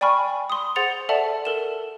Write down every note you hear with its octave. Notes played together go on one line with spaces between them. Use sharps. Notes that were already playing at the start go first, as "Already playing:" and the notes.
D5 G5 G#5 B5 C#6 F6
C6 D#6
G#4 C5 F#5 A6 C#7 F7
A4 D5 E5 F#5 A5
A4 A#4 E7